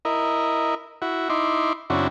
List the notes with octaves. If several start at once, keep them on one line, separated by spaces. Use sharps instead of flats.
E4 A#4 D#5
E4 F#4
D#4 E4 C6 D6
F#2 C#3 C4 D4 E4 F#4